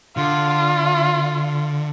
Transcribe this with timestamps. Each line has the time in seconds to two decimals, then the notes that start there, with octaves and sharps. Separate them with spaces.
0.17 D3 F4